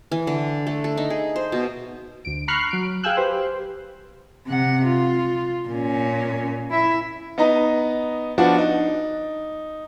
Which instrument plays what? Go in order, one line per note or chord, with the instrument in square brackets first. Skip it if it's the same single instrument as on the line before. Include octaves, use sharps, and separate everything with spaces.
[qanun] E3
D3
A3
A4
D#4
G#4
C5
B2
[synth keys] D2 D7
A#5 B5 C#6 F6 F#6 C7
F#3 D7
G#4 F5 G5 G#5 E6 F#6
G4 B4 C5
[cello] C3 F#5
F4
A#2 C#4
E4 E5
[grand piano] B3 D#4 D#5 A#5
F3 B3 D4 F#4
D#4